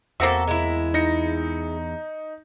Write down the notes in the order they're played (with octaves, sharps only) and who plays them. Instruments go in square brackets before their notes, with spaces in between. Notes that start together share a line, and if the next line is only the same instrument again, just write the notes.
[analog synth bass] E2 [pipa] A#3 C4 E5 [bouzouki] F#4 A4
[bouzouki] G#3 E4
[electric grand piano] D#4 A#6 C#7